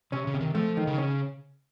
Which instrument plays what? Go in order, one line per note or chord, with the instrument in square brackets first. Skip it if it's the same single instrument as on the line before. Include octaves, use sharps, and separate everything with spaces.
[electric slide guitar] C3 [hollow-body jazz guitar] C#4
[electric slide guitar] C#3
[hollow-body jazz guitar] C3
[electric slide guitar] D#3
[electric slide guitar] F3 [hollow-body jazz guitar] A3
[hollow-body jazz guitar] D#3
[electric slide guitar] C#3
[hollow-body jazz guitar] C#4